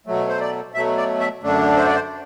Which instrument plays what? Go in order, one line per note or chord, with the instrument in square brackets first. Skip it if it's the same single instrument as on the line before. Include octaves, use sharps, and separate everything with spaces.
[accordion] B2 F#3 A3
C5
D5
B2 F#3 A3 E5
D5
E5
F#2 D3 A3 D4
C5
D5
C5